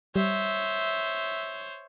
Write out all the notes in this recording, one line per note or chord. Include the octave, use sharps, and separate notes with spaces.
G3 C5 C#5 E5